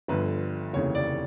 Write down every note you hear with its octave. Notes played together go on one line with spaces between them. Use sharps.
G1 G2 D3 F3 B4
F1 D#2 C#3 E3 C#5
D5